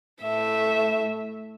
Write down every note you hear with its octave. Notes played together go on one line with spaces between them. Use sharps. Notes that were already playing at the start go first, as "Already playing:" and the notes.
A2 A3 E5